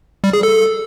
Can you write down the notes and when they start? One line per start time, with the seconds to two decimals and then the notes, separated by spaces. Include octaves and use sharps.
0.24 G3
0.33 G#4
0.43 A4